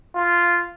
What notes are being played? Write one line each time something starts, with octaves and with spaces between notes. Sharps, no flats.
F4